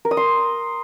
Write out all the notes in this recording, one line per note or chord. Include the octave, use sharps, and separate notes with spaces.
A#4
D#6
C6